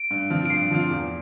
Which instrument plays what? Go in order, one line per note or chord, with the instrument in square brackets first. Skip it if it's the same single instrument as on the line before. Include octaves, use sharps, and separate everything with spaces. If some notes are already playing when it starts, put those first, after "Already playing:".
Already playing: [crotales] D7
[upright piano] G2
F3 C4 F4
[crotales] D7
[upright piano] G2 [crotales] C7
[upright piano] F3 C4 F4
E2